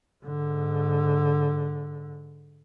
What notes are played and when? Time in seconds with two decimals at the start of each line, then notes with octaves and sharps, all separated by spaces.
0.24 G#2 D3